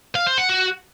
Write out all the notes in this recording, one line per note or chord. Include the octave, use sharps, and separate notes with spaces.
F5
C5
F#5
F#4